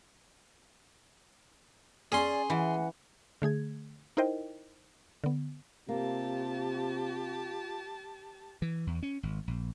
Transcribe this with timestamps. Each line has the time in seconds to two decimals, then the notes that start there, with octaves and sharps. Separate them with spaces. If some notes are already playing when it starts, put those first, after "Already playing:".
2.12 C#4 G#4 D5 C6
2.50 E3 F#5
3.42 D3 A3 G#4 G#6
4.17 D#4 E4 A#4 C5 D#5 G5
5.24 D3 B3
5.89 C3 A#3 F4 G4 A5
8.62 E3
8.87 E2
9.03 C#4
9.23 G#1
9.48 A#1